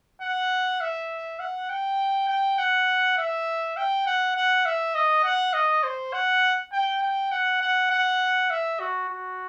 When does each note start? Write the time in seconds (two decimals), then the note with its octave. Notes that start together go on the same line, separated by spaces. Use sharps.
0.22 F#5
0.81 E5
1.40 F#5
1.70 G5
2.28 G5
2.58 F#5
3.18 E5
3.77 G5
4.06 F#5
4.36 F#5
4.65 E5
4.95 D#5
5.24 F#5
5.54 D#5
5.84 C5
6.13 F#5
6.72 G5
7.02 G5
7.31 F#5
7.61 F#5
7.90 F#5
8.50 E5
8.80 F#4
9.08 F#4